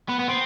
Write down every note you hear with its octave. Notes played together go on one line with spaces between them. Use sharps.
B3
B3
C4